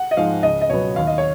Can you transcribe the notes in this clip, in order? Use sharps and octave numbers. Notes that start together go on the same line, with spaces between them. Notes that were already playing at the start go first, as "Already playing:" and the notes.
Already playing: F#5
D#5
G#2 F3 G#3 F5
C#2 D#5
D#5
B2 F#3 B3 C#5
D#2 F5
D#5
C#5